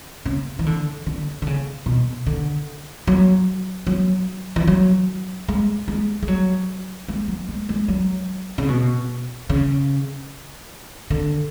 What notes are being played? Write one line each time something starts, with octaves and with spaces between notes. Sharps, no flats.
C#3
E3
D3
D3
D3
C#3
B2
D3
F#3
F#3
E3
F#3
G#3
G#3
G#3
F#3
G#3
F#3
G#3
G#3
F#3
C#3
B2
C#3
D3